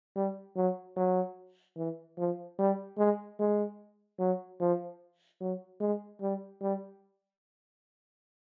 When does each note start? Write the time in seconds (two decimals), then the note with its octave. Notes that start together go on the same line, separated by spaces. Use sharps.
0.15 G3
0.56 F#3
0.96 F#3
1.76 E3
2.18 F3
2.58 G3
2.98 G#3
3.39 G#3
4.19 F#3
4.60 F3
5.40 F#3
5.80 G#3
6.21 G3
6.61 G3